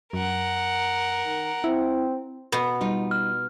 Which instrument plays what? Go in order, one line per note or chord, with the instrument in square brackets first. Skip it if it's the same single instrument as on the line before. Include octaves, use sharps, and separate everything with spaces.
[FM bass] F#2 [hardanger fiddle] A#4 F#5
[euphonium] D#3
[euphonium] C4 [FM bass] E4
[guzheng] B2 B3
[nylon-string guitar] G3 D#4 F4
[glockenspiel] F6